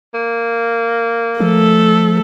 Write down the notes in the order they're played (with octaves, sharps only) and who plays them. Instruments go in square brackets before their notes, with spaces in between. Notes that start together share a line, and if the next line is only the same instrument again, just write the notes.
[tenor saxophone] A#3
[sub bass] F3 [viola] A3 A4